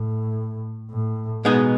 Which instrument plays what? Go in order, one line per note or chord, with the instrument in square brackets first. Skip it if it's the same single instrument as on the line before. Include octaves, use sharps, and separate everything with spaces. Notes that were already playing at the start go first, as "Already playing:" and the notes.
Already playing: [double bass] A2
A2
[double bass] B2 [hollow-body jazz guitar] G#3 B3 D#4 G#4